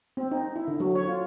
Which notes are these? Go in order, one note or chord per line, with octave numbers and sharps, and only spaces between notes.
C4
D#4
E4
D3
F#3
C#5
F4